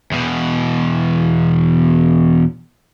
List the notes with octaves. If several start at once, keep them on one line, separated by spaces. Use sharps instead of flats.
E2 B2